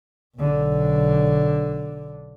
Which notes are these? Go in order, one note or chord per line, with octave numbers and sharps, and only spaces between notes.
B1 D3